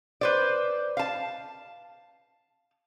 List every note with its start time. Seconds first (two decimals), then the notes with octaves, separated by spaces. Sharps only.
0.21 B4 C5 D5
0.97 F5 A5